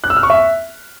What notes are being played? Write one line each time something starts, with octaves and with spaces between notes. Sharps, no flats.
F#6
E6
F6
C#6
E5